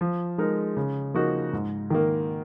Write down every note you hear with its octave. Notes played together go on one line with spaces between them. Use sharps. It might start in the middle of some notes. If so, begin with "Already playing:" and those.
F3
G#3 D#4 A#4
C#3
F3 A#3 D#4 F#4
G#2
D#3 A#3